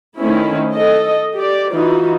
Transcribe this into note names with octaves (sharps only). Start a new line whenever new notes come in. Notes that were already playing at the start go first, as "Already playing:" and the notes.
D#3 A3 C4 C#4 E4
A4 D#5
G4 D5
E3 D#4 F4 F#4